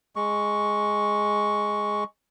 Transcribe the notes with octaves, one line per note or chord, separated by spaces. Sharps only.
G#3 C#6